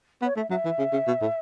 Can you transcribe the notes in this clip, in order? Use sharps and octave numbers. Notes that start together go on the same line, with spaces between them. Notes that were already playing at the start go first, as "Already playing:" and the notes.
B3
C#5
A3 E5
F#3 E5
E3
C#3
C#3
B2
A2